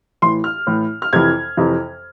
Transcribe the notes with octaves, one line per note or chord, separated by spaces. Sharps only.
A2 E3 C6
F6
A2 E3
F6
F2 C3 E3 G#6
F2 C3 E3